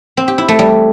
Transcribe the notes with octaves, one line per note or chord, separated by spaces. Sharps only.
C4
G4
E4
A3
G3